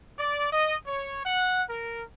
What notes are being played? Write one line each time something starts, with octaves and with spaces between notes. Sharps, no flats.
D5
D#5
C#5
F#5
A#4